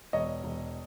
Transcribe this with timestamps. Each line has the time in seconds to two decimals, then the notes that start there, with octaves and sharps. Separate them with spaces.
0.13 E1 C#5 D#5
0.44 E1